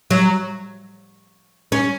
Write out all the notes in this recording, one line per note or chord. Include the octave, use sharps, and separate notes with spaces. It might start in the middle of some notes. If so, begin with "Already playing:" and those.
F#3
C#4